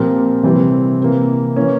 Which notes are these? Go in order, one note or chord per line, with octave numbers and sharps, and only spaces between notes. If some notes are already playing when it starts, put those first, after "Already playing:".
Already playing: A#2 F3 C4 G4 A#4
C3 E3 G3 C4
C3 E3 A#3
E3 A#3 C#4